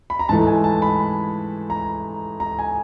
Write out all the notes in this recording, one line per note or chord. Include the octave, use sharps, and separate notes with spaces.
B5
A#5
G#2 E3 A3 A5
G#5
A5
B5
A#5
A#5
G#5